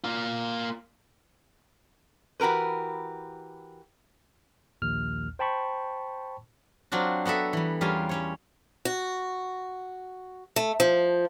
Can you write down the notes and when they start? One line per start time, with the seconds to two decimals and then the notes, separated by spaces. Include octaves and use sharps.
0.04 A#3 F4
2.40 E3 F#4 G4 A#4 B4
4.82 A#1 D#2 F6
5.39 C5 G5 A5 B5 C#6
6.92 F#3 C4 D4 F4 F#4
7.25 B3 F#4 A4 E5
7.53 E3 G3
7.81 E2 G3 C#4 F4 A#4 G#5
8.09 G3 C#4 C#5
8.85 F#4
10.56 A3
10.80 F3